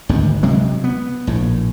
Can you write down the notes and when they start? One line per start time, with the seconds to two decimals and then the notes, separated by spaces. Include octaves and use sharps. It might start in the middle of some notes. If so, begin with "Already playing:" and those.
0.09 G#1 D2 G2
0.43 C3 F#3 G#3
0.84 B3
1.27 A#1 A2